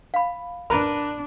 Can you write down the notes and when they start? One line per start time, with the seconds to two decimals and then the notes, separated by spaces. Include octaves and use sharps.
0.14 F5 B5
0.70 D4 A#4 B4 A#5 B5